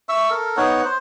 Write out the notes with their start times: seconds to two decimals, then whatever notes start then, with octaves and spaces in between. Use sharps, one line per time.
0.09 E5 C#6 E6
0.30 A4 A#4
0.57 B3 D#4 C#5 F#5
0.85 C5